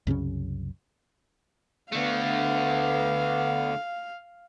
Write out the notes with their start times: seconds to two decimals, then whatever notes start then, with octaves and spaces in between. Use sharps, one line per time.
0.07 C2 F#2 C#3 C#4
1.93 D3 A3 B3 F5